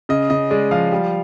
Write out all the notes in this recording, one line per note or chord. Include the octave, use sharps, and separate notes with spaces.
C#3 D#5
C#3 D#5
G#3 D5
F3 F5
G3